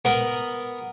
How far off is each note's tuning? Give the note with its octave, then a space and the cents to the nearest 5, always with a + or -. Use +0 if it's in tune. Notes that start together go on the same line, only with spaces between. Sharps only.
B3 +0 A#4 +0